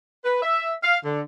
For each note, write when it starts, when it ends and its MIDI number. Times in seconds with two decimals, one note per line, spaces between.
0.24 0.39 71
0.42 0.72 76
0.83 0.97 77
1.05 1.21 50